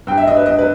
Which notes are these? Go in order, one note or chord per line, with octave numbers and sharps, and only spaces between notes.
G2 G5
E5
G2 D#5
B4
G2 D#5
B4